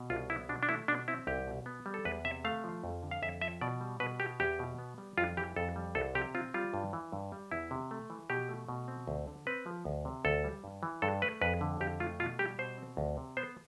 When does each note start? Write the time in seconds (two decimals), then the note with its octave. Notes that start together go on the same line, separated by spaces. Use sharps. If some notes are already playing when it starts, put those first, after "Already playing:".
Already playing: B2
0.10 C2 F4
0.30 B3 E4
0.49 B2 D4
0.63 D4
0.69 A3 E4
0.88 B2 D4
1.08 C4 E4
1.27 C2 G4
1.47 B2
1.66 B3
1.86 G3
1.94 A4
2.05 E2 B4
2.25 C3 E5
2.45 A3 F5
2.64 F3
2.84 F2
3.03 D3
3.11 F5
3.22 F2 E5
3.42 F3 E5
3.61 B2 D5
3.81 G3
4.00 B2 B4
4.20 B3 G4
4.40 E2 G4
4.59 B2
4.79 B3
4.98 G3
5.18 F2 F4
5.37 E3 G4
5.56 F2 A4
5.76 G3
5.95 C2 A4
6.15 C3 G4
6.35 C4 F4
6.54 G3 F4
6.74 G2
6.93 E3
7.12 G2
7.32 G3
7.52 E2 E4
7.71 C3
7.91 A3
8.10 E3
8.30 B2 G4
8.49 A3
8.68 B2
8.88 C4
9.08 D2
9.27 D3
9.47 C4 B4
9.66 F3
9.85 D2
10.05 C3
10.25 D2 A4
10.44 G3
10.64 G2
10.83 E3
11.02 G2 A4
11.22 A3 B4
11.41 F2 B4
11.61 D3
11.80 F2 G4
12.00 A3 F4
12.20 B2 F4
12.39 G3 G4
12.59 B2 C5
12.78 C4
12.97 D2
13.17 C3
13.37 B3 C5